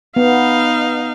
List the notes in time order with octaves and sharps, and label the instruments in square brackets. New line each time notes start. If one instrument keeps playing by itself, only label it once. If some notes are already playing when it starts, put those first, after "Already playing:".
[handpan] B3 [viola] D#4 F5